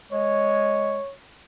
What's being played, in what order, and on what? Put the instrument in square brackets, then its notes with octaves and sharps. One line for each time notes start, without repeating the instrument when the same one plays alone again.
[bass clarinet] G#3 [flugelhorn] C#5